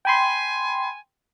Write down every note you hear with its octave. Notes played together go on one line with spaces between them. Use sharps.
G5 G#5 B5 C6